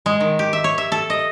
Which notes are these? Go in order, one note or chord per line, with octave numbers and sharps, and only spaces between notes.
G#3
D#3
G4
E5
C#5
E5
A4
D#5